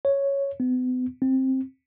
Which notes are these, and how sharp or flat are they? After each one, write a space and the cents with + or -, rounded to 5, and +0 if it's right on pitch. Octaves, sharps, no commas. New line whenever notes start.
C#5 +0
B3 +40
C4 +10